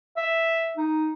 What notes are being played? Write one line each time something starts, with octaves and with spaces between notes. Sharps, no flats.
E5
D#4